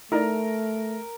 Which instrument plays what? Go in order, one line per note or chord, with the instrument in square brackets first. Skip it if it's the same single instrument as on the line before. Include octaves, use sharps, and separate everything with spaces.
[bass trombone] A3 [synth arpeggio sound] D#4 E4 D5 [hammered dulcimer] A#4